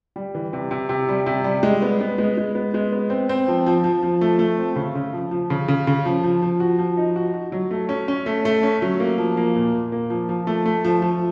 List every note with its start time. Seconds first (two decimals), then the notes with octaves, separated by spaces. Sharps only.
0.16 G3
0.35 E3
0.53 C3
0.71 C3
0.89 C3
1.09 G3
1.26 C3
1.44 G3
1.63 G#3
1.82 B3
2.01 B3
2.18 G#3
2.37 G#3
2.55 B3
2.74 G#3
2.92 B3
3.10 C4
3.29 C4
3.48 F3
3.66 F3
3.84 F3
4.03 F3
4.21 A3
4.39 A3
4.58 C4
4.76 C#3
4.95 C#3
5.13 F3
5.31 F3
5.50 C#3
5.68 C#3
5.87 C#3
6.05 F3
6.24 F3
6.42 F3
6.60 F#4
6.78 F3
6.97 D#4
7.16 F#4
7.34 F#4
7.52 F#3
7.71 A3
7.89 C#4
8.08 C#4
8.26 A3
8.45 A3
8.63 C#4
8.82 F#3
9.00 A#3
9.18 F3
9.37 A#3
9.55 A#2
9.73 A#2
9.92 A#3
10.10 F3
10.29 F3
10.47 A3
10.66 A3
10.84 F3
11.02 F3